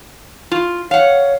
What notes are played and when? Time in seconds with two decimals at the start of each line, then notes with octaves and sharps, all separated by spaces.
0.51 F4
0.91 C#5 F5 F#5